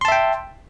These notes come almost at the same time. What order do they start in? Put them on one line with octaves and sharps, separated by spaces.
C6 A5 E5 G5